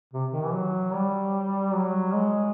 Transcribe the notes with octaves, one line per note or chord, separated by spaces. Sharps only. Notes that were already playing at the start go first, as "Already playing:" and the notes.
C3
D#3
E3
F#3
G3
F#3
G#3